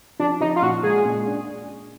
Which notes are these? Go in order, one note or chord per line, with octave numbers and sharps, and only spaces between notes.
F3 D4
F3 D#4
F4
A#2 F#4
G#3 G#4
A#2
D4